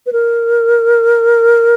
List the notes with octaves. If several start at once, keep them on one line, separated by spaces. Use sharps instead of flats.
B4
A#4